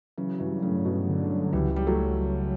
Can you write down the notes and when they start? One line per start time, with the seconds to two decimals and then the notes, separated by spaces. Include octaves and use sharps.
0.18 C#3 E3 F#3
0.40 G2 C#3 E3
0.62 A2 C#3 F#3
0.85 G2 B2
1.08 D3
1.31 F#3
1.53 C#2 E3 G3
1.76 C#2 G3
1.87 F#3 A3